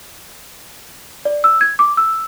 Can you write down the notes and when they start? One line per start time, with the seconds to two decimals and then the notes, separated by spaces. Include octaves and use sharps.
1.25 D5
1.44 E6
1.61 G#6
1.79 D6
1.97 E6